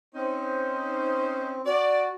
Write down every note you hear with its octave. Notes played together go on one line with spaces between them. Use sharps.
C4 C#4 D#4 C5
F#4 D5